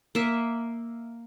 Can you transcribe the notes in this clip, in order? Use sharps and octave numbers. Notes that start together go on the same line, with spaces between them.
A#3 E5